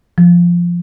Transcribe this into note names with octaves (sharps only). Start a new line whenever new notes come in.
F3